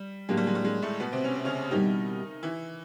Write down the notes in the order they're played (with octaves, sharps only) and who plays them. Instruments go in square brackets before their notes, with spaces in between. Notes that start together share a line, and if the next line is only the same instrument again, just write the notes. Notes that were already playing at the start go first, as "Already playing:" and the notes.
Already playing: [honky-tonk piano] G3
[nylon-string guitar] A2 F#3 A#3 D4 G4 [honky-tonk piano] G#3
[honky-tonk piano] G3
G#3
G3
G#3
A2 A3
B2 B3
C3 C4
C#4
C4
C#3 C#4
[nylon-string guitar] B2 G3 C4 E4 G4 [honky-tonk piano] D#3 D#4
[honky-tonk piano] E3 E4